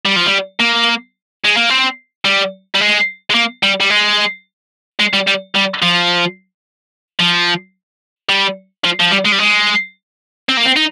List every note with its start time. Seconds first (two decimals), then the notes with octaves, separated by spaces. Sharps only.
0.05 G3
0.16 F3
0.26 G3
0.60 A#3
1.45 G#3
1.57 A#3
1.70 C4
2.25 G3
2.75 G3
2.81 G#3
3.30 G#3
3.35 A#3
3.63 G3
3.80 G3
3.90 G#3
5.00 G#3
5.13 G3
5.27 G3
5.55 G3
5.82 F3
7.20 F3
8.29 G3
8.85 F3
9.00 F3
9.12 G3
9.26 G#3
9.32 G3
9.39 G#3
10.49 C4
10.57 A#3
10.65 C4
10.76 D#4